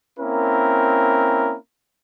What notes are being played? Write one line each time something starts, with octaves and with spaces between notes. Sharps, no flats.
A#3 C4 C#4 E4 A#4